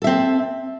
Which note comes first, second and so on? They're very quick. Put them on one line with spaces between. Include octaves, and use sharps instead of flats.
A4 E5 C4